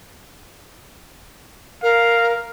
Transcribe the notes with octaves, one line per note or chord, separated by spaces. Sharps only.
A#4 F5